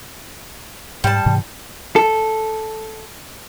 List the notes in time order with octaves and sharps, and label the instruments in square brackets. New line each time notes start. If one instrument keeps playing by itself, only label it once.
[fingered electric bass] G#2 [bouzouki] G3 A5
[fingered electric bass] G#2 C3 E3
[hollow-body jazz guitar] A4